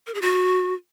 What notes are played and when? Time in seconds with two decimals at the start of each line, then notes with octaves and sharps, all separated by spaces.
0.07 A#4
0.14 G#4
0.22 F#4